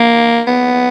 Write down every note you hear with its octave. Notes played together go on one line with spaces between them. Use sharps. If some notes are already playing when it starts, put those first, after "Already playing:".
Already playing: A#3
B3